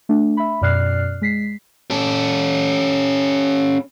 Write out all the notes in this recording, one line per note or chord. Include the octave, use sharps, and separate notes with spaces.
A3 D4
E5 B5
F#2 B2 D5 F6 F#6 C7
G#3 B6 C7
C#4 A4